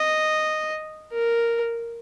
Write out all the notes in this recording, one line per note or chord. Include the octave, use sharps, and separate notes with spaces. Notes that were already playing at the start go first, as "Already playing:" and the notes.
Already playing: D#5
A#4